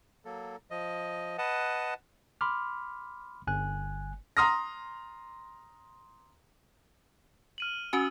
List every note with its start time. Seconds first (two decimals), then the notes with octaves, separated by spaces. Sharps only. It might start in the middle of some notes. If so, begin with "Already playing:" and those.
0.25 F#3 A#3 A4
0.71 F3 D#5
1.38 B4 D#5 F#5 A5
2.41 B5 C6 D6 F6
3.47 G1 G#5 F#6
4.37 A#5 C6 D#6 F6 A#6
7.58 F6 D#7 F#7
7.93 C#4 F#4 G#5 D#6 E6